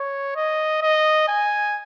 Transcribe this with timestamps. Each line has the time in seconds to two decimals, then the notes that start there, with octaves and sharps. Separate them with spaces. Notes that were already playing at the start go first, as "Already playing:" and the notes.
Already playing: C#5
0.36 D#5
0.82 D#5
1.28 G#5